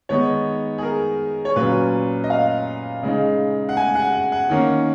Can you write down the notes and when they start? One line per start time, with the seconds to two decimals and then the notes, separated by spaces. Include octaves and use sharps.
0.09 D#3 G#3 B3 D#4 C#5
0.78 G#4
0.83 A#4
1.45 C#5
1.56 A#2 F#3 C#4 B4
2.24 D#5
2.30 F5
3.03 C#3 G#3 D#4
3.69 F#5
3.77 G#5
3.95 F#5
4.13 F#5
4.32 F#5
4.50 D#3 A#3 C#4